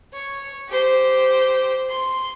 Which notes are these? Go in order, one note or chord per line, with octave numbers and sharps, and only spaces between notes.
C#5
G4 C5
C6